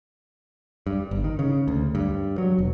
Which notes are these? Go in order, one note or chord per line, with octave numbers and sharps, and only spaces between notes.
G2
G1
D#3
C#3
D2
G2
F#3
E1